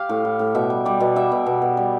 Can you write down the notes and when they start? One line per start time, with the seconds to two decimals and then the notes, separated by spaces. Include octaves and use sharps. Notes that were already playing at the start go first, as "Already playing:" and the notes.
Already playing: G4 F5
0.09 A2
0.25 A2
0.39 A2
0.55 B2 E5
0.70 G3
0.85 G3 D5
1.00 B2
1.16 G3 E5
1.32 B2
1.46 B2
1.62 B2
1.77 G3